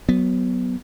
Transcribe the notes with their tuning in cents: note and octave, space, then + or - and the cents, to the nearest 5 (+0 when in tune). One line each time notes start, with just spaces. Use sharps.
F#3 +10 B3 +0